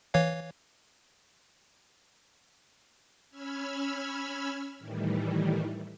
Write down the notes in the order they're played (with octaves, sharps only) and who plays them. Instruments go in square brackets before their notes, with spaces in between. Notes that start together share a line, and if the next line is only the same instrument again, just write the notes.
[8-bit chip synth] E3 C#5 F5
[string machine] C#4 B5 E6 F6 G#6
A2 D#3 E3 G3